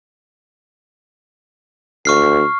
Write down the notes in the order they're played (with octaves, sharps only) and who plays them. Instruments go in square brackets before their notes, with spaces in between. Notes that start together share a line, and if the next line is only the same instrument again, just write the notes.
[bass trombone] D2 [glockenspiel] C#6 F6 C7